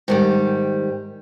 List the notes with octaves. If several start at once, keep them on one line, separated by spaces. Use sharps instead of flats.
G#2 D#3 G3